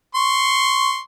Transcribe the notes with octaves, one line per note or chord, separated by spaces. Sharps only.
C6 C#6